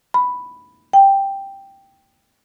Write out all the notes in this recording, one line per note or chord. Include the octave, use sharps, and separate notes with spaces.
B5
G5